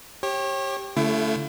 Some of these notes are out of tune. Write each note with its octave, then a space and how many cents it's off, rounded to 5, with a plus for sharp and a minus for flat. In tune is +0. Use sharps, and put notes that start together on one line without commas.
G4 +0 C#5 -35
D3 -45 A3 +0 E4 +35